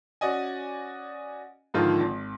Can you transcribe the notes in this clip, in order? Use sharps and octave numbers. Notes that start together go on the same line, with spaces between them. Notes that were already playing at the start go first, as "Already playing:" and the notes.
C#4 F#4 D5 D#5 G#5
G#2 D3 D#3 F3 F4
G#1